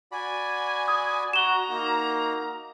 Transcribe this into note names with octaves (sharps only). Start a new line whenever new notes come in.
F#4 D5 G#5 B5
D#6
F#4 A#5 E7 G7
A#3 D#4 F#4